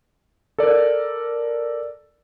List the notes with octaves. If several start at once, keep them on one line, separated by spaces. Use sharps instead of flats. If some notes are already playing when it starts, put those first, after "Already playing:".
A4 A#4 D5